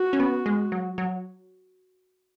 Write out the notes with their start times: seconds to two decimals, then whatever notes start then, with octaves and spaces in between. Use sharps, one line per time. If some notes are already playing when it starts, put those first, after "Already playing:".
Already playing: F#4
0.13 C#4
0.20 B3
0.46 G#3
0.72 F#3
0.98 F#3